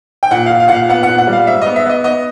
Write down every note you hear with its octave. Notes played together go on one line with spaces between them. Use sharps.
G5
A#2 F#5
A#2 F5
F5
A#2 F#5
F5
B3 F#5
F#5
A#2
F#5
G3
F5
G#2 E5
B3 D#5
E5
B3 D#5
B3 D#5